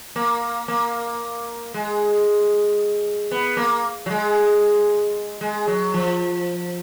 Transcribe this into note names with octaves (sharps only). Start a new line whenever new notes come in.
A#3
A#3
G#3
B3
A#3
F#3
G#3
G#3
F#3
F3